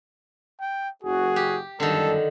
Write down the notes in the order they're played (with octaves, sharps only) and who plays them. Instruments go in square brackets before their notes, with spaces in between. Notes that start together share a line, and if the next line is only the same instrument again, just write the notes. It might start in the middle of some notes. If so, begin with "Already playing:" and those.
[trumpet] G5
[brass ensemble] F#1 F#4 [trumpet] G#4
[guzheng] G4
[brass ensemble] G1 F#2 G3 [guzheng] D3 D#3 [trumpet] A4